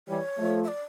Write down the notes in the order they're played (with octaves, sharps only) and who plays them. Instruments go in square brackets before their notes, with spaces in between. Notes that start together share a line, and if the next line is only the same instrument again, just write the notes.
[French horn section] E3 G3 [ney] C#5
[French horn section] F3 A3
[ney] E5
D5